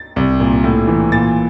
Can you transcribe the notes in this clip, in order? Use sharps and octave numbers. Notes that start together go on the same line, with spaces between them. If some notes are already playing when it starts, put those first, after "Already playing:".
Already playing: A6
C2
A#2
A2
E3
A#2 A6